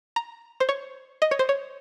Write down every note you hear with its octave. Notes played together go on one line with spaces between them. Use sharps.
A#5
C5
C#5
D#5
C#5
C5
C#5